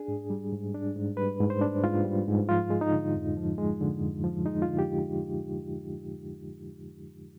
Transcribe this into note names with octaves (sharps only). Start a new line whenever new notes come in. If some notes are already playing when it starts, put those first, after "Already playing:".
Already playing: D4 G#4
G#2
G3
G#2
D4
G#2
G3 B4
G#2
C5
D4
G#2 F4
G3
G#2
F3 F4
G#3
D#4
D3
F2
F3
G#3
D3
F2
F3
G#3 D#4
F4
D3
G4